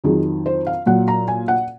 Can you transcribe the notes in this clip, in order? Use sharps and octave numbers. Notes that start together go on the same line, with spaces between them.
F2 D#3 F#3 G#4
C5
F5
A#2 F#3 F#5
A#5
G#5
F#5